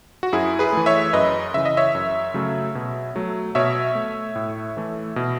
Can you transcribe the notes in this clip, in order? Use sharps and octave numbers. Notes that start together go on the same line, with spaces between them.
F#4
F#2 E4 G#4
G#4 B4
E3 A3
C#5 E5
F#2 B4 D#5
C#3 E3 E5
D#5
C#5 E5
F#2
C#3 F#3 A3
B2
F#3 A3
B2 C#5 E5
A3
A2
E3 A3
B2